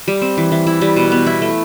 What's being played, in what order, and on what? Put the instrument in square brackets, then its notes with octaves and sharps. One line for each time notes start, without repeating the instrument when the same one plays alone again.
[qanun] G3
C4
E3
E3
E4
G3
B2
B3
E4
A3